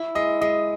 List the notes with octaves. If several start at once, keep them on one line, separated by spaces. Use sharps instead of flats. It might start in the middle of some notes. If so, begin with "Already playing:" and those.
Already playing: E4
G#3 D#5
G#3 D#5